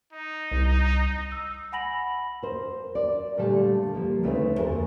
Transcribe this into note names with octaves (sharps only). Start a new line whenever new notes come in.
D#4
C2
E6
F#5 G#5 B5 A#6 F#7
A#4 C5
D5
A#2 D3 G3 A3 A4
F3 G3 A#3
D2 C#3 A3 C4 D#4 B4
F2 A#3 A4 A#4 G#5